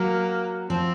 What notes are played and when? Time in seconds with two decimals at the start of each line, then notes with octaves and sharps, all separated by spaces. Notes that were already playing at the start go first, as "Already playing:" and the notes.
Already playing: F#3 A#3
0.70 F3 C4